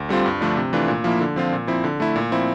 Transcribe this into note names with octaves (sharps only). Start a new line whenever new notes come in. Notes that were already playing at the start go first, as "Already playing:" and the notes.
Already playing: D2
D3 G3 C4 F4
G2
D3 F3 A3 D4
C3
E3 A3 D4 F4
A#2
F3 A#3 E4
D3
F3 C4 F4
A#2
F3 C4 E4
D3
A3 E4
A#2
F3 C4 E4